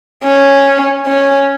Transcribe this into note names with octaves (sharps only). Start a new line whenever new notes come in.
C#4
C#4